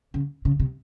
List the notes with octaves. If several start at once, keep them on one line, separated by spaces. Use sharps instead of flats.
C#3
C#3
C3